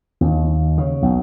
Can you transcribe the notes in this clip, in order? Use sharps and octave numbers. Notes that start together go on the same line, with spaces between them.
D#2
C#3
B1